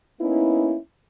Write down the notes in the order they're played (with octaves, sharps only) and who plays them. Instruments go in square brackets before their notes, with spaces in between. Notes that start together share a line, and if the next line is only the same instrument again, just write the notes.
[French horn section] A#3 B3 C#4 D#4 E4